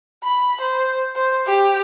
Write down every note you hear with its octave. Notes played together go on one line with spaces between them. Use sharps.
B5
C5
C5
G4